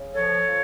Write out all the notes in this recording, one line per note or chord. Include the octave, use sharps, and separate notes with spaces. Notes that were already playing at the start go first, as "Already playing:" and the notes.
Already playing: C#3
F3 A4 C#5
F3